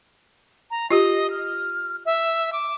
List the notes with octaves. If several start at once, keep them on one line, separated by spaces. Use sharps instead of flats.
A#5
F4 G4 D#5
F6
E5
D6